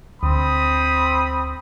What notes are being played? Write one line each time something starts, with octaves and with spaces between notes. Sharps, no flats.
D2 C4 B5 D#6